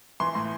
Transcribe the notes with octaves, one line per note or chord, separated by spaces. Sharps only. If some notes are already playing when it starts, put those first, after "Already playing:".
E3 C6
A2